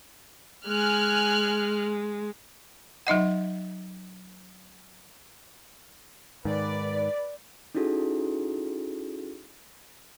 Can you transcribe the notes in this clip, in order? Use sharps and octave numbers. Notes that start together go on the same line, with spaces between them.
G#3 G#5 F6 F#6
F#3 D#4 D#5 F#5
G#2 D#3 B4 D5
C#4 D#4 E4 F#4 G#4 A4